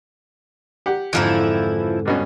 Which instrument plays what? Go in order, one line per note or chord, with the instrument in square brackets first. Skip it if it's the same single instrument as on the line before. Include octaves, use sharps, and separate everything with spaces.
[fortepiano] G4 F#5
[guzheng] F2 G#2 D3 [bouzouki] E3 F3 E4
[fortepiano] G2 B2 C#4